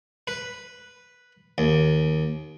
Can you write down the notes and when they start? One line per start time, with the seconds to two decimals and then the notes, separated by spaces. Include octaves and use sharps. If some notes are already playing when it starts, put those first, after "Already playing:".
0.27 B4
1.58 D#2